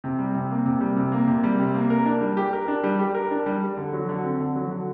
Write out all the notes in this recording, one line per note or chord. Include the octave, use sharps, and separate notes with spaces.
C3
G3
C3
A#3
C3
G3
C3
A#3
C3
G3
C3
A#3
A#4
D4
G3
G4
A#4
D4
G3
G4
A#4
D4
G3
G4
D3
F#3
D3
C4
D3
F#3
D3